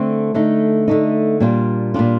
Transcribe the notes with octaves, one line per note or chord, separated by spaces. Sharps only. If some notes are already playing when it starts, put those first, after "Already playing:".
Already playing: D3 A3 C4
D3 A3 D#4
D3 A3 D#4
A#2 G3 D4 F4
A#2 G3 D4 F4